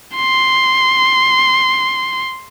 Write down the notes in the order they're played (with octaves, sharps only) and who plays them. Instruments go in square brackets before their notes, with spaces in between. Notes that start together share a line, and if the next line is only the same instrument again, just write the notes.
[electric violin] C6